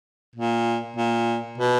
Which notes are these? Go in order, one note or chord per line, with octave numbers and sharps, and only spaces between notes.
A#2
A#2
B2